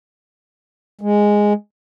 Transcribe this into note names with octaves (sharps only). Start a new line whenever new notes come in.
G#3